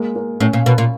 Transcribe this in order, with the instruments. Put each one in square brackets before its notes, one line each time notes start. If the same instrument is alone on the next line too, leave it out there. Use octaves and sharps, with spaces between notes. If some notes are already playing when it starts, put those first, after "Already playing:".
Already playing: [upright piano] G#3 A#3
A#3
[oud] A2 [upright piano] C#4
[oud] A#2
[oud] B2 [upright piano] A#4
[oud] A#2